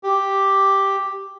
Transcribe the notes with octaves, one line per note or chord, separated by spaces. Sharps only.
G4